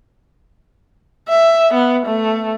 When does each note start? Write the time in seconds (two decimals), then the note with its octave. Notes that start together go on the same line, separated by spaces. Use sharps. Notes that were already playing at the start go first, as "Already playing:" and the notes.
1.28 E5
1.74 B3
2.06 A3